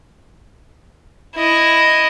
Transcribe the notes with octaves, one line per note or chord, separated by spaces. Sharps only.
E4 D#5